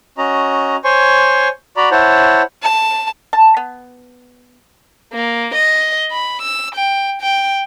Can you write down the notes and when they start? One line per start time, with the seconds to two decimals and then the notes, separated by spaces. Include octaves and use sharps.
0.18 C#4 F#4 D#5 A#5
0.84 C5 C#5 G#5 C6 C#6
1.77 F#4 D5 A#5 B5
1.91 E4 C5 C#5 F#5 A5
2.63 A5
3.33 A5
3.57 B3
5.13 A#3
5.54 D#5
6.11 B5
6.42 E6
6.75 G5
7.21 G5